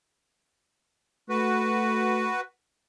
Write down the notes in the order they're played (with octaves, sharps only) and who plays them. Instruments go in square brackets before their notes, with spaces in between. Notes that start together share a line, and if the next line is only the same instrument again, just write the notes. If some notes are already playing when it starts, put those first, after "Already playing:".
[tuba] A3 [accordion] F#4 B4